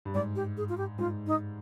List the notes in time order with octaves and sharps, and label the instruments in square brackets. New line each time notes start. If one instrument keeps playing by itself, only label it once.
[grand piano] G2
[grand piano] G#2 [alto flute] D5
[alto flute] G4
G#4
F4
G4
[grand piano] G#2 [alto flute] F4
[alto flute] D#4